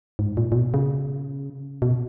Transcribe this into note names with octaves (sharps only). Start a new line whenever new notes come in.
G#2
A#2
A#2
B2
C#3
B2